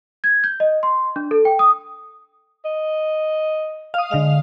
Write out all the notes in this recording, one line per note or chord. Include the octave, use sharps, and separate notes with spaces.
G#6
G6
D#5
C6
D4
A4
G5
D#6
D#5
F5 D#6
D3 G#3 F5 F7